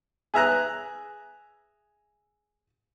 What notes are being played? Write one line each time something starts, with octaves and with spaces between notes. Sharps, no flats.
G#4 E5 A#5 F#6